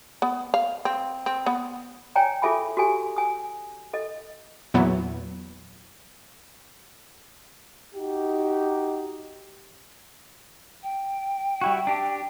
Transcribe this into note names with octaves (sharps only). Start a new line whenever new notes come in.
B3
F5
C4
C4
B3
C#5 D5 G5 G#5 A#5
F4 G#4 A4 E5 G#5 B5
F#4 G4 A4 G#5
G#5 D#6
A4 D#5
E2 A#2 F#3 B3 E4
D#4 F#4 G4
G5
G3 E4 F#4
D4 G4